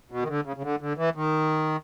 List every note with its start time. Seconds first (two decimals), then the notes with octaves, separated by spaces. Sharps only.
0.11 B2
0.22 D#3
0.28 D3
0.46 C#3
0.56 C#3
0.63 D3
0.81 D3
0.97 E3
1.15 D#3